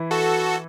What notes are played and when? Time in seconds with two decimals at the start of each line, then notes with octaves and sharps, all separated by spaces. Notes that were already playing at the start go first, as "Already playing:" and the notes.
Already playing: E3 E4
0.11 F#4 A4